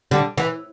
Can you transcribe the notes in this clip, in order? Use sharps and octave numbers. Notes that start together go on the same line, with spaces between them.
D3 G3
E3